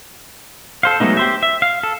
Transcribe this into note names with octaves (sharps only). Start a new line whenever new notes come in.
A4 C5 F5
F#3 G#3 A3 B3 D#4
G4 C5 E5
E5
F5
A4